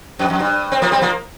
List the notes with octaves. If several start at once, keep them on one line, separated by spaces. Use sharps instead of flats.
F2
F2
G2
C4
F3 A#3
G3 C4
F3 A#3